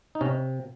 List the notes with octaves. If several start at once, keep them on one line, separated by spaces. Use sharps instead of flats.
D#4
C3 C#4